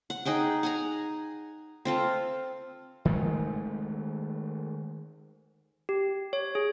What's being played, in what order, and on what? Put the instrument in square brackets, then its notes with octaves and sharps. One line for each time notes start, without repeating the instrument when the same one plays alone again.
[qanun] F#5
D#4 G#4 F#5 G5
F#5 G#5 A#5
C4 F4 A4
[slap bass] D#3 G#3 A3
[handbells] G4
C#5
G#4